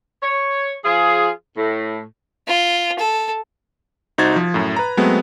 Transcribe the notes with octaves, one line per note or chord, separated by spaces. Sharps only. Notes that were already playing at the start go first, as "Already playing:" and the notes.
C#5
F3 F4 G#4
A2
F4
A4
C2 D#4 F#4 C5 G#6 A6
F3
F#2 A2
B4 A#5
F#3 G#3 A3 B3 C4